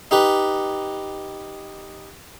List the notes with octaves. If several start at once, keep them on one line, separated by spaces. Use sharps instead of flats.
D#4 G4 B4